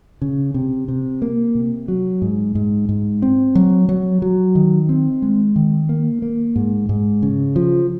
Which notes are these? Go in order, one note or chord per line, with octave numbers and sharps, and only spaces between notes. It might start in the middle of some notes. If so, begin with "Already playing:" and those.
C#3
C3
C3
A#3
C3
F#3
G#2
G#2
G#2
C4
F#3
F#3
F#3
D#3
C4
G#3
D#3
A#3
A#3
G#2
G#2
C#3
F3